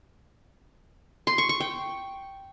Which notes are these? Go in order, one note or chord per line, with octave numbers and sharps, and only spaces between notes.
C6
C#6
C#6
G5